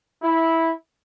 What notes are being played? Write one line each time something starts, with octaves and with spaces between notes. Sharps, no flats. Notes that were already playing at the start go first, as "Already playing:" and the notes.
E4